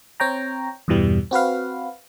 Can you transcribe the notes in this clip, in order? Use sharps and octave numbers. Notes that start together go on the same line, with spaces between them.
C4 C#5 G5 A#5
E2 G2 B2 E3 G3
C4 F#4 B4 F5